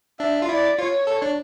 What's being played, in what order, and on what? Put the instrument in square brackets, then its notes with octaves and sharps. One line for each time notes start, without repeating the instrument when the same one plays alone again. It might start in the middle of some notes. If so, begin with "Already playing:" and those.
[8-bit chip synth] D4 [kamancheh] E5
[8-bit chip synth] F4
[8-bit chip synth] E4 [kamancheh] D5
[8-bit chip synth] F4 [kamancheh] C#5
[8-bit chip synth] A4
D4